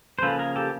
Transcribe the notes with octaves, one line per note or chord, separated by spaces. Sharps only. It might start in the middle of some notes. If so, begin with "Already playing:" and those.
C5
C#3 F3 A#3 C#4 A4 B4
G#4 A#4
G4 A4